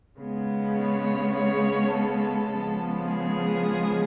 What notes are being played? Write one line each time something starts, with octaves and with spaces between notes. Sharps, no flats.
C#3 G#3 B3
C#5
C#5
A4
C#3 F3 G#3 B3
G#4